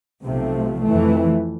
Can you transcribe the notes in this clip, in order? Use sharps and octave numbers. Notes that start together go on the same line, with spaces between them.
B1 C3 F3 A3
F2 E3 A3